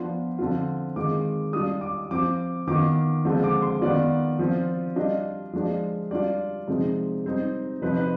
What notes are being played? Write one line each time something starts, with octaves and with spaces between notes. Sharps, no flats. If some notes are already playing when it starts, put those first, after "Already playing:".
Already playing: F3 B3 D4 F4 C6
D3 F3 C4 F4
D#3 G#3 C4 F4 D6
G3 D4 F4 D#6
D6
F3 C4 F4 D6
D#3 B3 F4 D6
D3 F3 G#3 C4 F4
D6
C6
D#3 B3 F4 D5
F3 C4 F4
G3 D4 F4 D#5
F3 G#3 D4 F4
G3 D4 F4 D5
C3 F3 G#3 C4 D#4
G3 C4 D#4
C3 F3 C4 D#4 B4
B4